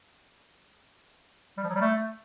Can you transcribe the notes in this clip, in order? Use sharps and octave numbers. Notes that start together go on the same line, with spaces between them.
G3
F3
F#3
G3
A3